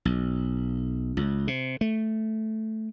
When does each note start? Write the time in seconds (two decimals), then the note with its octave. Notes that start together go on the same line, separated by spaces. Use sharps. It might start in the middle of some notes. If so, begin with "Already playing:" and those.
0.05 B1
1.17 C#2
1.48 C3
1.81 A3